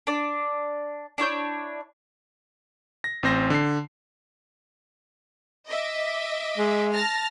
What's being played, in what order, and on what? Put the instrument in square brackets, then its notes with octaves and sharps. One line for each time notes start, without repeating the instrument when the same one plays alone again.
[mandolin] D4 D5
D4 E4 C#5 G6
[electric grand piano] A#6
A1 C4 C5 A#6
D3 C7
[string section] D#5 E5 D6
[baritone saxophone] G#3
[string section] A5 F6 A#6